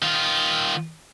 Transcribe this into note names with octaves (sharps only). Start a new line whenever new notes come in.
D#3 F4